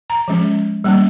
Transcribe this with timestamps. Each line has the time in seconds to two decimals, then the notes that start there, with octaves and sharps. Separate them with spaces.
0.10 A#5
0.28 F3 G#3 C#4
0.84 G3 A#3 C#4